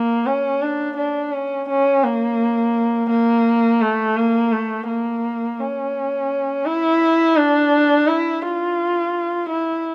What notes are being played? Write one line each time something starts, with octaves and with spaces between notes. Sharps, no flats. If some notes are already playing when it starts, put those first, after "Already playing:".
Already playing: A#3
C#4
D4
D4
C#4
C#4
A#3
A#3
A3
A#3
A3
A#3
C#4
E4
D4
E4
F4
E4